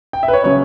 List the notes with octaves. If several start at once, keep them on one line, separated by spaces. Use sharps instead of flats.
G5
E5
B4
C#5
C#3 F#3 C#4 C#5